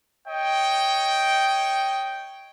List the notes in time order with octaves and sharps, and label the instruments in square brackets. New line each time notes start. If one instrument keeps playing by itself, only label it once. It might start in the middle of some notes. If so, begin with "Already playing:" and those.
[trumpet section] C#5 D#5 G5